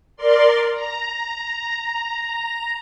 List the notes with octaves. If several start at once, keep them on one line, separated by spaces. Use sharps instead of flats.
A#4 D5 C6
A#5